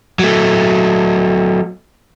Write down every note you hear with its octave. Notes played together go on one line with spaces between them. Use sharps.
F#3 A3